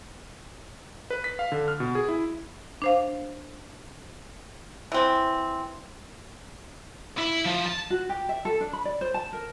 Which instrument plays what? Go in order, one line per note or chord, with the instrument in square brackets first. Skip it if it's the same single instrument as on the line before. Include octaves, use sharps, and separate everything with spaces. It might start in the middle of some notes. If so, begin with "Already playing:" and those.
[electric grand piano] B4
B6
F5
D3
F6
B2
G#4
E4
[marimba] D4 C5 F5
[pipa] E3 C4
[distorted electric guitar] E4
F3
A5
[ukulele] F#4
G4
E5
A4
D4
B5
D5
C5
A5
A#4